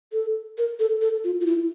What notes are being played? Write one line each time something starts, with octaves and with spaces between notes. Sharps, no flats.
A4
A#4
A4
A4
F4
F4
E4